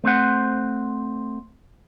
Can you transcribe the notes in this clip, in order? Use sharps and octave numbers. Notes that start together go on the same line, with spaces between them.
A3 C4 C5 F#5